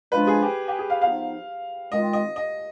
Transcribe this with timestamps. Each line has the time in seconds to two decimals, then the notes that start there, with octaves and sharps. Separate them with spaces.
0.12 F3 G#3 D4 F4 B4
0.27 G#4
0.42 G4
0.68 G4
0.79 G#4
0.90 F5
1.01 F3 B3 D#4 F5
1.91 D#3 G#3 C4 F4 D#5
2.13 D#5
2.36 D#5